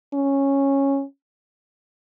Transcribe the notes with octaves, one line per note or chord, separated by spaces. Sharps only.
C#4